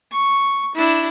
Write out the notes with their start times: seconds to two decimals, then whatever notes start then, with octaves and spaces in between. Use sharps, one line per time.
0.11 C#6
0.75 D4 E4